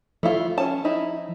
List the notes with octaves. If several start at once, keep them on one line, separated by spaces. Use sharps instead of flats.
F3 A3 E4 F4
C#4 A5
D#4 E4